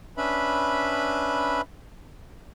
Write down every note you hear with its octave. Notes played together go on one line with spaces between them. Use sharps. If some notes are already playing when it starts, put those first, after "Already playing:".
C#4 D4 B4 E5 B5